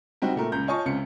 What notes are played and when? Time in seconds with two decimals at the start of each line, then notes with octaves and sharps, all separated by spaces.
0.22 G3 C4 D#4 F#4
0.36 A#2 A3 A#4
0.52 C#2 A#5 G6
0.68 F4 C#5 D#5 G#5 A5 C#6
0.86 C#2 C3 F5 C#7